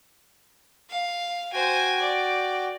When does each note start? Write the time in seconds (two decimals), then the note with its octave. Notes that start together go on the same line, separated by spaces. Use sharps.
0.90 F5
1.53 F#4 C5 G5 G#5
2.01 D5